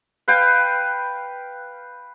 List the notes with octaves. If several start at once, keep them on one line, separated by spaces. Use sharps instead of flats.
B4 F5 G5